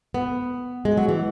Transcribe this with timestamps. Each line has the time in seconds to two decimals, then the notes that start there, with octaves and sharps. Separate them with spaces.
0.14 B3
0.85 G#3
0.97 F#3
1.08 E3